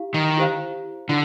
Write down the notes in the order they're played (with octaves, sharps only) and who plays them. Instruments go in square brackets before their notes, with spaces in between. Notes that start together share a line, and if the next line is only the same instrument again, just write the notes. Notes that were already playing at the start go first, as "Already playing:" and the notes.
Already playing: [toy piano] E4 G4 F5
[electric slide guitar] D#3
[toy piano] E4 G4 C5 F5 A#5
[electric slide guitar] D3 [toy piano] E4